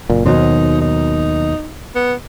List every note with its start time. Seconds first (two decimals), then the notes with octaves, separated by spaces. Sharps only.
0.10 F#1 A#2
0.26 D#2 B2 D#3 F#3 D#4 F#4 C5
0.81 D#4
1.95 B3